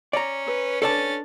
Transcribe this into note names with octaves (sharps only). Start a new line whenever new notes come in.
C#4 D5 A#5
B4
C#4 D4 A4 D5 A5 A6